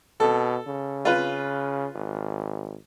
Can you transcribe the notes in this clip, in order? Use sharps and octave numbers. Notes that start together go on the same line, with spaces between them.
B2 A4
C#3
F4 B4
G#1